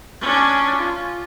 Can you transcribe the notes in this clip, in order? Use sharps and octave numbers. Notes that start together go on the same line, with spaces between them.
C#4 D4
F4